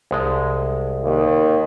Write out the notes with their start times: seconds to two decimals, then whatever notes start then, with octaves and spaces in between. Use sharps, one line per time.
0.11 C2 G#3 A5
1.04 D#2